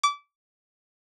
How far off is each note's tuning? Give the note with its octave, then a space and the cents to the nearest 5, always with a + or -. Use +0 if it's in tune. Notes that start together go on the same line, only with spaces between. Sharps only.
D6 -25